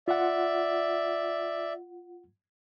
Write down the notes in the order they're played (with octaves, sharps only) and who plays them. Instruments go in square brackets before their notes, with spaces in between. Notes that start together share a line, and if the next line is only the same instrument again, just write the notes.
[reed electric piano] F4 F#5 [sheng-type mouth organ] D5 E5